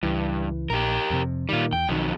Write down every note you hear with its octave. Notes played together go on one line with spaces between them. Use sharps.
C#2 G2 E3
A#1 G4 A#4
F2 C3
A#2 D#3 G3 F4
E2 G5
B1 F2 D#3 F#3